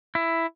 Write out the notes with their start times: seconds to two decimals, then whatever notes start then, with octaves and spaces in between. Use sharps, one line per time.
0.15 E4